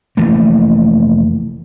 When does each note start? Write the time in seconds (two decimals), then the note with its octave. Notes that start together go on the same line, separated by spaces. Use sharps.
0.17 F1 E3 A3 A#3